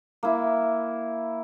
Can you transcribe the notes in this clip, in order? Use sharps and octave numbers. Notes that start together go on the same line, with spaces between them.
A#3 E4